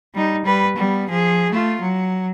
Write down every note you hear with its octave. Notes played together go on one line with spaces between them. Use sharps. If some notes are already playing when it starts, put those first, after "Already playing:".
G3 D#4
G3 B4
G3 B3
F3 G#4
A3 F4
F#3